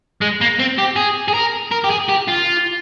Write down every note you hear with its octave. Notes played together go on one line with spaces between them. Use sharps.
G#3
A#3
C4
G4
G#4
G#4
A#4
A#4
G4
G#4
G4
F4